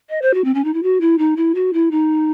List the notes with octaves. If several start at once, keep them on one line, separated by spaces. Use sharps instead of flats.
D#5
C5
F#4
C4
C#4
D#4
E4
F#4
E4
D#4
E4
F#4
E4
D#4